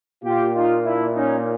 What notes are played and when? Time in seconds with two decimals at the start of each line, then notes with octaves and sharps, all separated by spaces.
0.24 A#2 F4 G4
0.54 D#4 F4
0.85 D4 E4
1.15 C#4 D#4